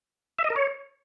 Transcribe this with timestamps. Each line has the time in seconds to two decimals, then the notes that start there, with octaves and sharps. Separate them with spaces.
0.39 E5
0.44 D#5
0.50 A#4
0.56 C#5